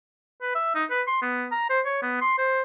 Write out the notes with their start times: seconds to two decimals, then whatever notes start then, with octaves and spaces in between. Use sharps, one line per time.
0.42 B4
0.55 E5
0.75 D#4
0.90 B4
1.07 C6
1.22 B3
1.51 A#5
1.70 C5
1.85 C#5
2.02 B3
2.22 C6
2.38 C5